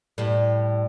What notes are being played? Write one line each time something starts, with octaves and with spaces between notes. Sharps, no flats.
A2 G3